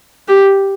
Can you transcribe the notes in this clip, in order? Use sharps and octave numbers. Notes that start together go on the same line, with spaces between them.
G4